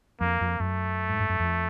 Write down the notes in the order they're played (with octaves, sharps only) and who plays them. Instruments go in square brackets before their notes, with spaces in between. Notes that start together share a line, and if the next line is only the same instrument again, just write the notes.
[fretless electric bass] F2 [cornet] A#3
[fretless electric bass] F2
[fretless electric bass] F#2 [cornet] A3
[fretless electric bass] G#2
G2
F#2
F2